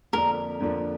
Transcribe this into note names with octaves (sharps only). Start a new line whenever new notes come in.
F2 D3 F3 A#3 D4 A#4
F2 D3 F3 A#3 D4